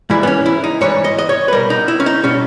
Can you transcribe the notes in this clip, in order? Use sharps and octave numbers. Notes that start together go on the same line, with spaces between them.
G#2 E3 G3 E4
B3
C#4
E4
D#4
G#2 E3 G3 C#5
D#5
D#5
C#5
B4
B2 G3 A#4
D#4
E4
C#4
D#4
B2 G3 C#4